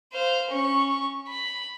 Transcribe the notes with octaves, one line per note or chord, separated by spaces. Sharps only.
C5 F5
C#4 C#6
B5